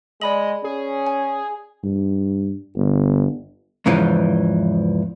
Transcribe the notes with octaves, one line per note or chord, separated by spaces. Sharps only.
G#3 D5 D#5 B5 F#7
C#4 G#4
G#5
G2
G1
E2 G#2 C#3 E3 F3